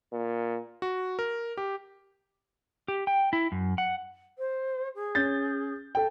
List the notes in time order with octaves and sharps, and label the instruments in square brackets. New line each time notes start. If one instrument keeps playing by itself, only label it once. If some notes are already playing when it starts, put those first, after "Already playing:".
[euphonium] A#2
[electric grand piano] F#4
A#4
G4
[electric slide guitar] G4
G5
E4
F#2
F#5
[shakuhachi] C5
G#4
[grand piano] C#4 G6 A6
A4 G5